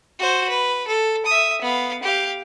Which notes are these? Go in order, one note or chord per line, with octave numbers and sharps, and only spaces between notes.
F#4 C5
B4
A4
E5 D#6
B3 F5
G4 F5